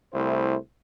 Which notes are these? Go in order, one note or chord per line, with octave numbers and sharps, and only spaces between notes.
C2 A3 E4 C5